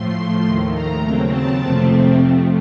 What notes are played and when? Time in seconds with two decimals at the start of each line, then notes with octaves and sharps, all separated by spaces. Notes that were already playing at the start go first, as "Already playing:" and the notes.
Already playing: A2 F3 A3 C6
0.45 D#2 D#3 A3
0.73 A#5
1.02 D#2 C#3 F#3 C4
1.30 A5
1.59 F2 C3 F3 A3 C4
2.16 C3 F3 A3